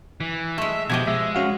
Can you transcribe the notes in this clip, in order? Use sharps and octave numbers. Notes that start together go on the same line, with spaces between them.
E3
G#3 A3 E5
B2 F3 G4 D#5 G#6
G#3 E5
C#4 F#4 F5